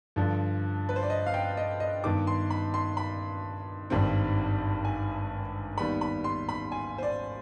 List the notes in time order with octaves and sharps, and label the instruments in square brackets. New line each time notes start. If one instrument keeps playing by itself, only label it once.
[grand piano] G2 D3 F3
B4
C5
D5
D#5
F5
G5
D#5
D#5
G2 D#3 B3 D6
C6
B5
C6
B5
G#1 G2 D#3 G3 C4
G#5
D#2 D#3 G3 B3 B5
B5
C6
B5
G#5
C5
D5